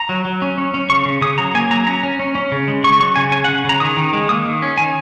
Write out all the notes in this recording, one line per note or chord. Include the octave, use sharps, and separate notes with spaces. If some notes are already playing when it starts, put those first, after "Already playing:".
Already playing: A#5
F#3
F#3
C#4
C#4
C#4
C#3 C#6
C#3
C#3 D#6
F#3 A#5
A#3 G#5
F#3 A#5
C#4 A#5
C#4
C#4
C#4
C#3
G#3
C#3 C#6
F#3 C#6
C#3 G#5
C#4 G#5
C#3 F#5
C#3 A#5
D#3 D#6
D#3
G#3
A#3 D#6
D#3
C#4
D#3 G#5